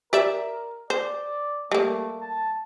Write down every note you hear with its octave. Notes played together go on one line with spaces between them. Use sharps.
G4 A#4 D5 E5
C5 D5
G3 A3 A#3
A5